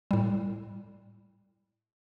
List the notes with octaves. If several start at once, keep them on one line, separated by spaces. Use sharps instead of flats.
A2 G3